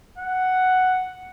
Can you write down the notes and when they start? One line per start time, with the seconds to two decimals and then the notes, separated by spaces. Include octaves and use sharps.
0.18 F#5